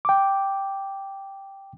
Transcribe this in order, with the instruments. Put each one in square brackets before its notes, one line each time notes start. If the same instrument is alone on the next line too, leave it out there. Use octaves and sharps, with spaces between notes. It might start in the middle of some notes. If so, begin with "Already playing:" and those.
[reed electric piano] G5 D6